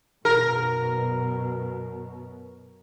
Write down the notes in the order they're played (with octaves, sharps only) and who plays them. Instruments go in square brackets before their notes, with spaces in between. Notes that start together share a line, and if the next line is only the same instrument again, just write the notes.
[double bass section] F#2 B2 [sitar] A#4